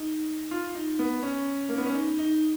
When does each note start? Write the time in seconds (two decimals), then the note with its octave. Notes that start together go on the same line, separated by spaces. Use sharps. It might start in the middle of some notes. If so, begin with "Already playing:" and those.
Already playing: D#4
0.51 F4
0.75 D#4
0.99 B3
1.23 C#4
1.69 A#3
1.78 B3
1.86 C#4
1.94 D#4
2.19 D#4